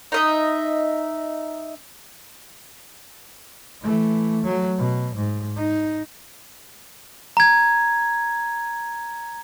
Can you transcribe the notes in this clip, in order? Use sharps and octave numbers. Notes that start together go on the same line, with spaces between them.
D#4 D#5 E5
E3 A3
F#3 A3
B2
G#2
D#4
A#5 G#6